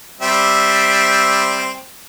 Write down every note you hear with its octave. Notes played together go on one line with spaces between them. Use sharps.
G3 C4 E5